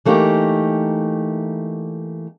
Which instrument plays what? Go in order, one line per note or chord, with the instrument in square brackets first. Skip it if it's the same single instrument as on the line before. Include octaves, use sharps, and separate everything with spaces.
[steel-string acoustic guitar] E3 A3 A#3 D#4 G4